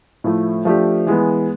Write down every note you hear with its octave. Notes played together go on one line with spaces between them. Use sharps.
A2 F3 A3
F3 A3 D4 G4
E3 G#3 B3